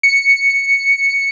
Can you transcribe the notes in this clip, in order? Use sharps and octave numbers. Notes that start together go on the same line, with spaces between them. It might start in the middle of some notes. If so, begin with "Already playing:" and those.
C#7